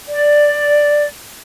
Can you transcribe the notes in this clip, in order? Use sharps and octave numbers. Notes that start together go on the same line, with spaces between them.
D5